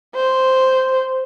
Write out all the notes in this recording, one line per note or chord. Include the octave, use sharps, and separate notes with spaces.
C5